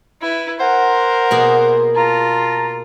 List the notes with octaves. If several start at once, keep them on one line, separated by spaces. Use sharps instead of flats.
E4 B4
A#4 C5 F#5
B2 A#3 G#4
F4 A5 A#5